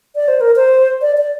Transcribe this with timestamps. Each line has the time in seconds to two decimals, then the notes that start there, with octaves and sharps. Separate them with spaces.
0.16 D5
0.28 C5
0.41 A#4
0.56 C5
1.02 D5
1.17 D5